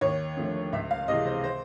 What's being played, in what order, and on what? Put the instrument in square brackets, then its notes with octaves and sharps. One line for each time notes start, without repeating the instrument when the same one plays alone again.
[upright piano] D#2 C#5
D3 F3 A3
C#2 E5
F5
C3 E3 G#3 D#5
C5
C5